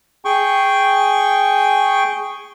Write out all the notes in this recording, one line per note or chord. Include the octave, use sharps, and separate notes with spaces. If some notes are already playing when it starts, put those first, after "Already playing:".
G#4 G5 C#6